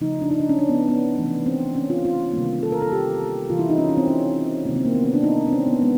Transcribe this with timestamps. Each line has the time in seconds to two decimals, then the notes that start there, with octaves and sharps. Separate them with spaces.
0.01 C#3 F3 A3 D#4
0.22 D4
0.30 D#4
0.40 D4
0.49 C#4
0.59 D4
0.69 B3
0.89 B3
1.17 C3 E3 A3
1.46 C4
1.75 C#4
1.90 F4
2.05 F4
2.33 C3 D#3 G3 A#3
2.63 A4
2.72 A#4
2.82 A4
2.92 G4
3.50 C3 E3 G3 F4
3.59 E4
3.70 D#4
3.78 C#4
3.89 C#4
3.97 C4
4.08 C#4
4.65 C3 D#3 F#3 A#3 C4
4.76 C4
4.85 A#3
4.95 B3
5.04 C4
5.14 D4
5.24 D#4
5.48 C4
5.53 C#4
5.67 B3
5.82 G#3 B3